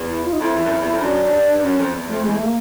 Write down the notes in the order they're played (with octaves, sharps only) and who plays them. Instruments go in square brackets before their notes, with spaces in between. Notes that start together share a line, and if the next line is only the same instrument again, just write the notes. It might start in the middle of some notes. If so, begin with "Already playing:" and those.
Already playing: [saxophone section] E2
[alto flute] E4
F4
D#4
[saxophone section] F2 [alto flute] E4
[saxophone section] E2
F#2
F2
E2
F2
[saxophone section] F#2 [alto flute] D4
[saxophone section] F#2
G2
G2
[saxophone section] F#2 [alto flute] C#4
[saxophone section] F2
E2
[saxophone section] F2 [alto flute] A3
[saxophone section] E2 [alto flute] G#3
[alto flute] A3
A#3